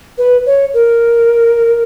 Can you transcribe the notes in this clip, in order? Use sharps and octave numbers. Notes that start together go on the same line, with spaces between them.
B4
C#5
A#4